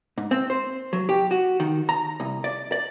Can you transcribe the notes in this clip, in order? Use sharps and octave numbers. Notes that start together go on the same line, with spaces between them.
G#2
C4
C5
F#3
G4
F#4
D#3
A#5
C2
D5
D5